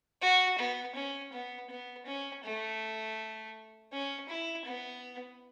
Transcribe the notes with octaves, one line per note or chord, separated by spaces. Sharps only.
F#4
B3
C#4
B3
B3
C#4
A3
C#4
E4
B3